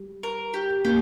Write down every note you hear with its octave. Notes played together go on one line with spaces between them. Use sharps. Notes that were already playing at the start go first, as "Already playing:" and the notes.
Already playing: G3
A#4
G4
A#3 G4